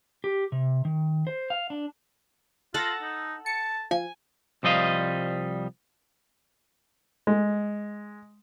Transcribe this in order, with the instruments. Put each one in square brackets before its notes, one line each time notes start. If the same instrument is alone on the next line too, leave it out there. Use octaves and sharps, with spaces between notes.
[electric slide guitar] G4
C3
D#3
C5
F5
D4
[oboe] F4 [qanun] A4 F#5 [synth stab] A6 A#6
[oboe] D#4
[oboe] A5 [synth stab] C#7
[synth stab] F3 [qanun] G#5
[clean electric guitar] C2 F3 G3 D#5 F5
[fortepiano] G#3